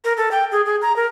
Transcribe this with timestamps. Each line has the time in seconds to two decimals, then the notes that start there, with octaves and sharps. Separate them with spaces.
0.04 A#4
0.17 A4
0.31 G5
0.52 G#4
0.66 G#4
0.82 A#5
0.96 A#4